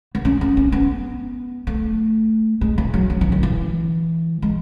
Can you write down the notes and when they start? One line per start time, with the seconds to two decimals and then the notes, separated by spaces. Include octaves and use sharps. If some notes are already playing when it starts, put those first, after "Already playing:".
0.15 B3
0.25 C#4
0.41 B3
0.57 C#4
0.72 B3
1.67 A3
2.61 G#3
2.78 E3
2.94 F#3
3.10 F#3
3.21 E3
3.32 D#3
3.43 E3
4.42 G#3